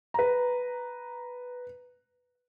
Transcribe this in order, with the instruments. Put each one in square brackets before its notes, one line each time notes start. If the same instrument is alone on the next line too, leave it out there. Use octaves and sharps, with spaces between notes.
[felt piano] B4 A#5